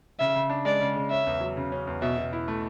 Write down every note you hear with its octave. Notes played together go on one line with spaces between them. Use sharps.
C#3 E5
C#3
D4
G#3 D5
C#3
C#3
C#4 E5
E2
F#3
C#3
C#4
E2
B2 E5
B2
E4
A3